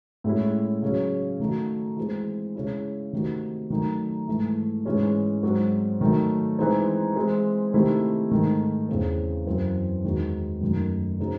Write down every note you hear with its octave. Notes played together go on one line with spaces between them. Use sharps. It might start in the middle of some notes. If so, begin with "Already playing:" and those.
A2 G#3 C#4 E4
C#3 F#3 C#4
D#3 A3 D#4 F#4
E3 G#3 C4
C#3 G#3 C#4 E4
C3 D#3 A3 C4 F#4
D#3 F#3 A3 D#4
G#2 E3 A3
G#2 E3 G#3 C#4
G#2 F#3 C4 F#4
D#3 F#3 A3
E3 G#3 C4 D#4
E3 G#3 C4
C3 D#3 A3 C4 E4
G#2 D#3 A3
E2 C#3 E3 C4
F#2 E3 C4
E2 D#3 G#3 C4 F#4
F#2 D#3 A3
C#3 F#3 C4 D#4